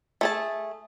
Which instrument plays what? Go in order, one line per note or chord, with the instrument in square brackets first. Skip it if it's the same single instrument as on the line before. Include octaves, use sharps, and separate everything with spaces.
[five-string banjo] A3 G#4 A5